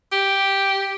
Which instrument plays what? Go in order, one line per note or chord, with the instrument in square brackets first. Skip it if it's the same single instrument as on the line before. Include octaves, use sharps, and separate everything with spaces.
[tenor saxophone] G4